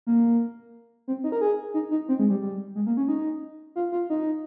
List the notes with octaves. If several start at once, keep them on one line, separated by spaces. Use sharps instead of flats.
A#3
C4
D#4
A#4
G#4
D#4
D#4
C4
G#3
G3
G3
G#3
A#3
C#4
D#4
F4
F4
D#4